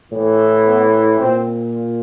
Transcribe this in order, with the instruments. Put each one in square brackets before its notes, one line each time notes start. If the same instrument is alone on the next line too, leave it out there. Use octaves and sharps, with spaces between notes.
[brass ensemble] A2 E3
B3
A#2 C4